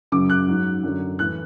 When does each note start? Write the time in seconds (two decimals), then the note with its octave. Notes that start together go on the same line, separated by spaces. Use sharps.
0.12 F#2 C#3 F#3 D6
0.30 F#6
0.48 G#2 F#3
0.83 F#2 D3 F#3
1.19 A2 E3 F#6